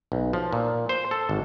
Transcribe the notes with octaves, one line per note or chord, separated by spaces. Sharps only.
B1
F3
A#2
C5
A4
G#1